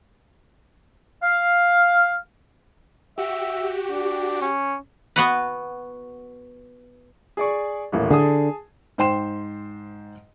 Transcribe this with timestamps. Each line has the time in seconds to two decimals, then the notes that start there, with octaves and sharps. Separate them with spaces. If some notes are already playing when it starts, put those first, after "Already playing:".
1.23 F5
3.18 F#4 G4 E5
3.91 D4
4.42 C#4
5.16 B3 F#4 B4
7.37 G#4 D5 C#6
7.92 D#1 A1 A#3
8.11 D3 G#4 A5 D#6
8.98 G#2 C5 G5 C6 E7